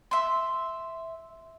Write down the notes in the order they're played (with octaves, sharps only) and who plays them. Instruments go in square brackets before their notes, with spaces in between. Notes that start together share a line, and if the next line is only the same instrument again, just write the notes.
[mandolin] E5 C6